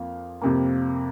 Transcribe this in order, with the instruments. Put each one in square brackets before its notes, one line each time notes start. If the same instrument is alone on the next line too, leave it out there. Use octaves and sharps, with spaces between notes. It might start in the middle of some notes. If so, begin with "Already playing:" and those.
Already playing: [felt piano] F2 F3 A#3 F5
F2 C3 A#3